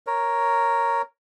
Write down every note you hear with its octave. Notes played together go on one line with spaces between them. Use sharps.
A#4 C#5